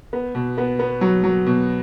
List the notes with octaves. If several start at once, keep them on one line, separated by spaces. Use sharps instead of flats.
B3
B2
B3
B3
F#3
F#3
B2